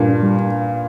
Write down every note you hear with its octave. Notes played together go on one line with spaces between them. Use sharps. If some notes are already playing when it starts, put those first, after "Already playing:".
Already playing: G2 A#2
D4
G3